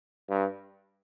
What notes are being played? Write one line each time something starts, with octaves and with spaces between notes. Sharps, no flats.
G2